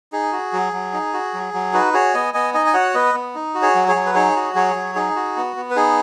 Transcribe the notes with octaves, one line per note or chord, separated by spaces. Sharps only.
D#4 G#4
F#4
F#3
F#3
D#4
F#4
F#3
F#3
D#4 F#4 B4
F#4 G#4 C#5
B3 D#5 G#5
B3 D#5 G#5
D#4 D#5 G#5
G#5
F#4 C#5 F#5
B3 B4 D#5
B3
D#4
F#4
G#4 C#5
F#3
G#4 C#5
F#3
B4
D#4 G#4 C#5
F#4
F#3 G#4 C#5
F#3
D#4 G#4
F#4
B3
B3
B4
D#4 G#4